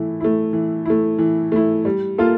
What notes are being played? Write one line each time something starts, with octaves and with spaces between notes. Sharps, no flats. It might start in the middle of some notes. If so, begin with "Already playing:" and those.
Already playing: E3 A3 E4
A3 E4
E3
A3 E4
E3
A3 E4
G3
A#3 F4 A4